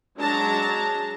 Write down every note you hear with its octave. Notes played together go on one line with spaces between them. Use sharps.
F#3 G#3 D4 A5 A#5